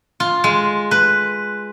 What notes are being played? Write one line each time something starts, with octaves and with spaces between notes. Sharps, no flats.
F4
G#3
B4